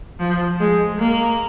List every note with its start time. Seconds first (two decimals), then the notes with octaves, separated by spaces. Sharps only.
0.19 F3
0.60 G#3
0.99 A#3